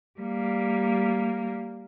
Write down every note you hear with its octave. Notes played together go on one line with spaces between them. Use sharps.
G3 A#3